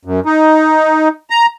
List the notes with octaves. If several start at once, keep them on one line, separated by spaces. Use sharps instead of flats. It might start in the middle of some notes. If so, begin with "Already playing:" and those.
F#2
D#4
A#5